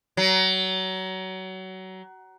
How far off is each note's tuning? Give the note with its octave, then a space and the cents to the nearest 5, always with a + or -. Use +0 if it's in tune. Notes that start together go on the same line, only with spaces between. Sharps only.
F#3 +25